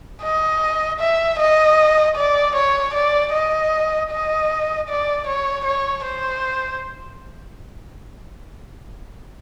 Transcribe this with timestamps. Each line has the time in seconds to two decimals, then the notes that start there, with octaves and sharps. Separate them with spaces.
0.23 D#5
1.00 E5
1.39 D#5
2.16 D5
2.55 C#5
2.94 D5
3.33 D#5
4.11 D#5
4.88 D5
5.27 C#5
5.65 C#5
6.05 C5